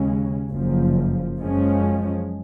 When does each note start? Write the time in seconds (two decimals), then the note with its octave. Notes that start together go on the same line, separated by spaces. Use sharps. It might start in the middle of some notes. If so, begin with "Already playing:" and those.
Already playing: D#2 C#3 G#3 C#4
0.51 F#1 F#2 F3
1.38 F#2 F3 G#3 C#4